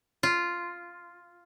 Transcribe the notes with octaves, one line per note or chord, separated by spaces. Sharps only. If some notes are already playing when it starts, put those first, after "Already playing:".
F4